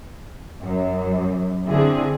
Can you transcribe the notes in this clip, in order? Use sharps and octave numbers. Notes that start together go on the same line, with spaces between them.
F#2
D3 C4 E4 G#4